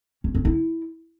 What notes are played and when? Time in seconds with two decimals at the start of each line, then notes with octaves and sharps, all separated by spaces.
0.24 C#4
0.34 C#4
0.45 E4